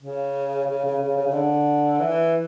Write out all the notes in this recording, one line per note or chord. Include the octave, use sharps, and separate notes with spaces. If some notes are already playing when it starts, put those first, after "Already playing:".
C#3
C#3
C#3
C#3
C#3
C#3
D3
E3